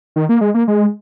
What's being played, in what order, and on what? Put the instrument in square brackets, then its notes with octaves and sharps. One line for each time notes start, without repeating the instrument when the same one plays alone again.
[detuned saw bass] D#3
A#3
G#3
A#3
G#3